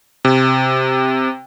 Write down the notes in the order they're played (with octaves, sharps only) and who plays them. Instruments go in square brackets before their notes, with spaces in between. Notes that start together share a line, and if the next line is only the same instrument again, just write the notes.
[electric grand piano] C3